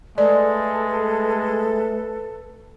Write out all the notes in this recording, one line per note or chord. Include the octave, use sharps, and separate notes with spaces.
G#3 A3 A4 B4 D5